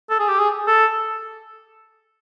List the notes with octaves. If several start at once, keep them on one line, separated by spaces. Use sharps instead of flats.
A4
G#4
G4
G#4
A4